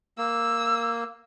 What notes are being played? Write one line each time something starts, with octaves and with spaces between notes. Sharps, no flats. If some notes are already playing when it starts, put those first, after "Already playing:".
A#3 E6